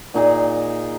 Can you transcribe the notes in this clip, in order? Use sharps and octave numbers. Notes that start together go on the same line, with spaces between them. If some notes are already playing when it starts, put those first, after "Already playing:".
A#2 D#4 G#4